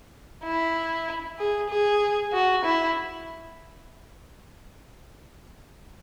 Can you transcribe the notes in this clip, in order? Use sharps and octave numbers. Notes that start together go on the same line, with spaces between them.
E4
G#4
G#4
F#4
E4